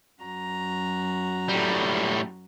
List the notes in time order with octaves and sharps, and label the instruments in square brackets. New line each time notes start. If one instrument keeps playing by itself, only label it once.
[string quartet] F#2 F#4 A#5
[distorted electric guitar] A2 G3